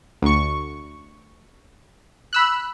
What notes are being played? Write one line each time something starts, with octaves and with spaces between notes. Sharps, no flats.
D2 C#6
B5 E6 F#6